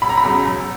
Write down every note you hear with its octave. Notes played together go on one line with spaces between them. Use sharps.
E1 B5
A#5
B5
E2 C#3 F#3
E1